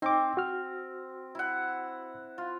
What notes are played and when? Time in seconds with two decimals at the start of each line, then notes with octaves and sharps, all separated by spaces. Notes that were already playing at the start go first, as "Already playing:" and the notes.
0.02 C4 D#4 D6
0.37 F#4 F6
1.35 E4 F#5
2.38 F4